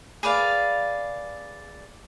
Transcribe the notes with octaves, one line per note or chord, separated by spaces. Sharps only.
G#4 B4 D5 F5